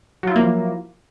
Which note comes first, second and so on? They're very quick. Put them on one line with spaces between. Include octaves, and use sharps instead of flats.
F#3 F4 E4 A#3 F3